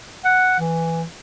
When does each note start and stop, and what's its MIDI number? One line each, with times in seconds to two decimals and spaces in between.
0.24 0.57 78
0.59 1.03 52